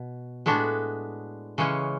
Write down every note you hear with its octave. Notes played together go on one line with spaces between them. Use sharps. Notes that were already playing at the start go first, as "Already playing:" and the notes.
Already playing: B2
A2 G#3 B3 D4 F#4
C#3 E3 G#3 C#4